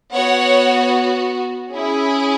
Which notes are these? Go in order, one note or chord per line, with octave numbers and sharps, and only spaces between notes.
B3 F#4 C#5 F#5
C#4 E4 G#4